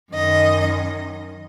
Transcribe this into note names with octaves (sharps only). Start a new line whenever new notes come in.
F#2 D#3 D#5